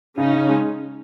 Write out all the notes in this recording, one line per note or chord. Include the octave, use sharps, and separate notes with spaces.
C#3 C#4 D#4
C#3
G#3